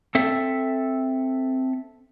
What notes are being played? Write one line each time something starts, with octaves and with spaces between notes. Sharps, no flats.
C4 A4 E5